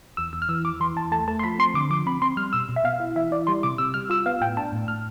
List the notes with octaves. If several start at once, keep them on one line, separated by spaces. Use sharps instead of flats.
E2 E6
E2 E6
F6
E3 E6
E2 D6
E3 C6
E2 A5
A3 A5
A3 A5
C6
F3 B5
C4 C6
D3 D6
F3 D6
C4 B5
C4 C6
G3 F6
B2 E6
B2
E5
B2 F5
E4
E3 E5
E4 D5
G3 C6
C3 D6
C3 E6
G3 F6
F4 E6
B3 F5
A2 G5
D4 A5
A2
A2 F6